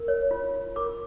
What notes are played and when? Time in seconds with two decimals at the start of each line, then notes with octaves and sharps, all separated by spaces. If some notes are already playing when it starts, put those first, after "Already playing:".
Already playing: A#4
0.08 C#5
0.31 F4
0.54 F4
0.76 A#4 D6